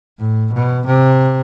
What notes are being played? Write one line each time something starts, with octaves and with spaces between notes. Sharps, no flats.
A2
B2
C3